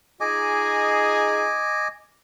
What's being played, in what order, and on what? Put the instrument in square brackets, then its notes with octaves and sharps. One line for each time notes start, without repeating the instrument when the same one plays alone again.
[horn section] D#4 F4 G#4 [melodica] D#5 G#5 D6